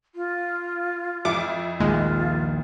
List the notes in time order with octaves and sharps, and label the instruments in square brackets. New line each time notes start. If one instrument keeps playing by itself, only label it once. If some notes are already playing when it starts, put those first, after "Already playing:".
[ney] F4
[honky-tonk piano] F2 E4 C#7 [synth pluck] D6
[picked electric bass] A#1 D#2 [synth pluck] G#3 [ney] F4